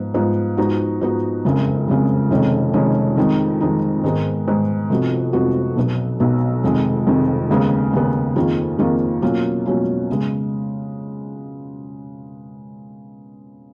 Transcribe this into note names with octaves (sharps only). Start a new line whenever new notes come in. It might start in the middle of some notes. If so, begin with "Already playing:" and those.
Already playing: G#2 F3 B3 F4
G#2 F3 B3 F4
G#2 F3 B3 D#4 F#4
G#2 F3 B3 D#4 F#4
F#1 F2 C#3 G#3
F#1 F2 C#3 G#3
F1 F2 D#3 G#3 C#4
F1 F2 D#3 G#3 C#4
F2 D#3 G#3 D#4
F2 D#3 G#3 D#4
G#2 D#3 G#3 B3
G#2 D#3 G#3 B3
F1 F2 F3 B3 F#4
F1 F2 F3 B3 F#4
B1 B2 F#3 B3
B1 B2 F#3 B3
F1 F2 D#3 G#3
F1 F2 D#3 G#3
D#2 C#3 G#3 B3
D#2 C#3 G#3 B3
F2 D#3 A#3 F4 G#4
F2 D#3 A#3 F4 G#4
B2 F#3 A#3 C#4 F4
B2 F#3 A#3 C#4 F4
C#3 G#3 B3